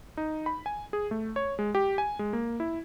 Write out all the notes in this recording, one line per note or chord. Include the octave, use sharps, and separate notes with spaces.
D#4
B5
G#5
G#4
A3
C#5
G#3
G4
G#5
G#3
A#3
E4